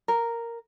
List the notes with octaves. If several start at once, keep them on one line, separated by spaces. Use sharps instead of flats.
A#4